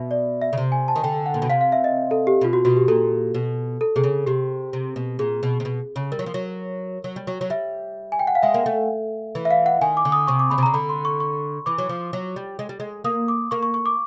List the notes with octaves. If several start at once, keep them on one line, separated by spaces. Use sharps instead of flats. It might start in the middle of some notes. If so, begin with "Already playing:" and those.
Already playing: B2 E5
D5
E5
C#3
C3
G#5
A5
D#3
D3 G5
F#5
A#2
B2
C3 F5
F5
E5
D#5
A4
G4
B2 F4
F#4
B2 F#4
G4
A#2 A4
B2
A4
C3 G#4
C#3
C3 G4
C3
B2
A#2 G#4
B2
C3
B2
C#3
G3 A#4
F#3
F3
F#3
F#3
G3
F#3
F#3
G3 E5
G#5
G5
F#5
F5
G#3 E5
A#3
A3
E3
E5
F5
F#5
D#3 G#5
D6
D3
D#6
C3 C#6
D6
C#3 B5
C3
A#5
C#3
D3 B5
C6
C#6
C#6
E3 D6
F#3
F3
F#3
G3
G#3
G3
G#3
A#3 D#6
D6
A#3 C#6
C#6
C#6
D6